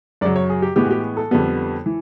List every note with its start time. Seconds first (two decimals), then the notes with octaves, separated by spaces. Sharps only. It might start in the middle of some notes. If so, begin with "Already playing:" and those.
0.21 F#2 C#3 F#3 D5
0.36 C#5
0.50 G#4
0.62 G4
0.76 A2 E3 G#3 B3 G4
0.85 F#4
0.91 G4
1.17 A4
1.31 F2 D3 G3 B3
1.86 E3